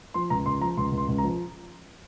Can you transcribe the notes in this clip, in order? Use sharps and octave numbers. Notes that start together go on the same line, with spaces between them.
F3 C6
C#2 A#5
C#2 C6
F3 A#5
C#2 C6
C#2
C6
C#2
A#5
F3